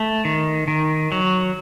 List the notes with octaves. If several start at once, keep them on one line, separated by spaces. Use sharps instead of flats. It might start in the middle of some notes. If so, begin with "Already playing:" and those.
Already playing: A3
D#3
D#3
F#3